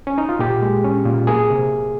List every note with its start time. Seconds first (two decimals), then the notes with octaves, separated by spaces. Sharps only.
0.07 C#4
0.18 D#4
0.29 F4
0.39 A#2 G4
0.62 G#3
0.84 C#4
1.05 A#2
1.27 A#3 G#4
1.50 C3